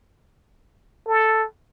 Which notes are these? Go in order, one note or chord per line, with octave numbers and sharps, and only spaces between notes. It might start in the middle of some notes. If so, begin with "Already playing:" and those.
A4